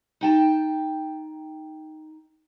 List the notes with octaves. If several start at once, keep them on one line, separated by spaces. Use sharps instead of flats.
D#4 G5 A5